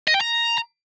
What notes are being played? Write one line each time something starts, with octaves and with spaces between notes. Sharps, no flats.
D#5
G5
A#5